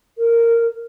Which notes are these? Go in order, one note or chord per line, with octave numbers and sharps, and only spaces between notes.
A#4